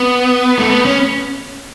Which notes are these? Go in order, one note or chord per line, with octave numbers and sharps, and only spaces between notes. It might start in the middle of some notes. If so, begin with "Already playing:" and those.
Already playing: B3
A3
B3
C#4